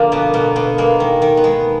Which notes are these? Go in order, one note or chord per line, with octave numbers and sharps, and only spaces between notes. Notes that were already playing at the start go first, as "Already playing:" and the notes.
Already playing: D3 F3 A#3 D4
B2 B3
B2 A#3
B2 B3
G#3 A#3
D#3
D#3
B3
G#3